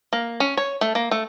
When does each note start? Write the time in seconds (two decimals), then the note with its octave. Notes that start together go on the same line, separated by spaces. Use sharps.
0.13 A#3
0.40 C#4
0.57 C#5
0.81 A3
0.95 A#3
1.11 A3